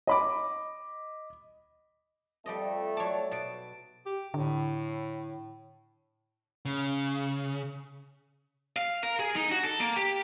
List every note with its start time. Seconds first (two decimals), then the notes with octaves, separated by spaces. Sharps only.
0.07 D#5 B5 D6
2.46 F2 G3 A3 D5 D#5
2.97 F#3 C#5 D5 A5
3.31 B2 A5 D7
4.06 G4
4.34 A2 D3
6.65 C#3
8.76 F5
9.03 A#4
9.20 G#4
9.36 D#4
9.51 F#4
9.63 A4
9.80 A#3
9.96 G4